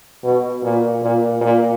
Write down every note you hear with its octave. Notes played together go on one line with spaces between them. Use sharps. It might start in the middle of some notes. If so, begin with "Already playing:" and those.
B2
A#2
A#2
A#2